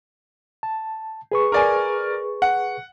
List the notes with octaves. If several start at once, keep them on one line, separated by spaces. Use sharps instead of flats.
A5
G#4 B4 C#6
A#4 D5 G#5
F#5